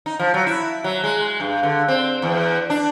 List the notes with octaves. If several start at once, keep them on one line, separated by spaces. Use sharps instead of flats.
D#4
F3
F#3
E4
F#3
G#3
G2
D3
C4
E2
D4